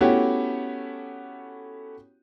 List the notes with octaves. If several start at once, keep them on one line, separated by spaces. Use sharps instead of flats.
A3 B3 C#4 E4 F#4 G4